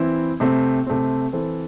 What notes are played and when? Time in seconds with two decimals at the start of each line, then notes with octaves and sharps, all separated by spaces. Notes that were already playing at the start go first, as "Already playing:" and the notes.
Already playing: E3 C4 E4
0.40 C3 A3 C4
0.87 C3 A3 C4
1.33 E3 C4 A4 C5